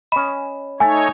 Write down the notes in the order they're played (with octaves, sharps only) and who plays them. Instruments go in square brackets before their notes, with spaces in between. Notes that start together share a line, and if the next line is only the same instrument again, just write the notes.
[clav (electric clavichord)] C#4 D#5 [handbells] B5
[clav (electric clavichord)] A3 [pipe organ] D#4 C#5 [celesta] G#5